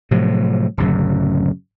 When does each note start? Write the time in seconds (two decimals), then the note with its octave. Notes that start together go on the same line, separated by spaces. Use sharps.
0.11 A2 C3 F3 F#3
0.77 D1 F#2 C#3